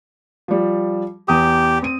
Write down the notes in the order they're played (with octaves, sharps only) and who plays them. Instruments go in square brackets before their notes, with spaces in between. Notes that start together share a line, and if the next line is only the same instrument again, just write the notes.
[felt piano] F3 G3
[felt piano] E2 D#6 [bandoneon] G4
[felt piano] C4 D#7